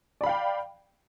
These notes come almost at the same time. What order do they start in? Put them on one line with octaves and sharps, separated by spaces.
D5 B5 F5 G5